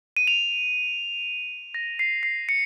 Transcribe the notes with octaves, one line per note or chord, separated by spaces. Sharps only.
D#7
F7
A#6
C7
C7
C#7